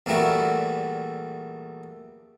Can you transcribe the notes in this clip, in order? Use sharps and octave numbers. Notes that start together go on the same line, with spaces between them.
E2 A#2 G3 A3 E4 F#4